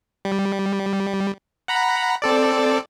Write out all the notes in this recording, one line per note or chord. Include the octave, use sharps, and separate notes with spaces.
G3
F#5 A#5 B5
C4 A4 D5